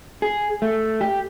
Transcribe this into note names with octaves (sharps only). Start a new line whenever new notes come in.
G#4
A3
G4